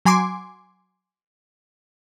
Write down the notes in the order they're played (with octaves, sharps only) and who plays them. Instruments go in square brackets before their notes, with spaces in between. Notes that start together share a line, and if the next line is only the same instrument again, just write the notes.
[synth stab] F#3 G#5 C6 D6